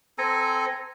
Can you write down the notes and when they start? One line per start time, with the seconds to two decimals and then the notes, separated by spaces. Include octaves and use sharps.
0.18 C4 A4 G#5 A#5